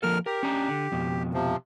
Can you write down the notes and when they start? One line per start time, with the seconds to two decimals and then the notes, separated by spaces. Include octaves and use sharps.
0.03 F3 A#3 A4 A#4 F6
0.26 G4 A#4
0.43 C#4 D4 A#5
0.68 D3
0.92 F2 B2
1.34 C3 F3